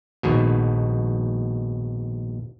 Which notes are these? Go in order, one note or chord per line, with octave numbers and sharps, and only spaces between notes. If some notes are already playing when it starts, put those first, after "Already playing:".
A#1 D#2 G#2 B2